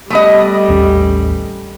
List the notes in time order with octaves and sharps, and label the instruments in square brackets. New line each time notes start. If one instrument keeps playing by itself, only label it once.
[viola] G3 [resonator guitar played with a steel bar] A3 B3 D#5
[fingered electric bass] A1 D#2 C#4